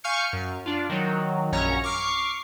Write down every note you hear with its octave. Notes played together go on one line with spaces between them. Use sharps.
F5 G#5 C#6 F6 G6 C#7
F#2
D4 F4
D#3 F#3
A#1 F#2 C#4 C#5 A#5
C#6 D6 F6 C7